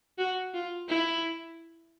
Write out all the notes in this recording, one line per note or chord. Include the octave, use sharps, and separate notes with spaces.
F#4
F4
E4